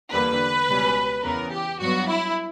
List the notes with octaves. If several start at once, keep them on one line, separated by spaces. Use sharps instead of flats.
E2 D3 G3 A#3 B4
C#2 B2 G3 C#4
E2 C#3 E3 B3 A#4
G4
G2 F#3 B3 F#4
E4